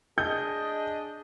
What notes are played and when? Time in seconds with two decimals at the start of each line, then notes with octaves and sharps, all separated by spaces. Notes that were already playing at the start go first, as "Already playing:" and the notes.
0.18 D4 G#4 D#5 G6